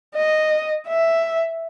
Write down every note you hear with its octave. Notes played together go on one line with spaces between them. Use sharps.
D#5
E5